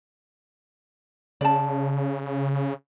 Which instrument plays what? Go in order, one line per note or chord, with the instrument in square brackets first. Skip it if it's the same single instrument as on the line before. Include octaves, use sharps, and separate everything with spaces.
[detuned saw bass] C#3 [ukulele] D5 A5